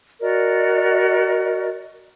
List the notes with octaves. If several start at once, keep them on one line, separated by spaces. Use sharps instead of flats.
F#4 A#4 D5 D#5